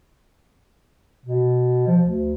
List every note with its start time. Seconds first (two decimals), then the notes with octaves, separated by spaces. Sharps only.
1.26 B2
1.87 F3
2.03 D2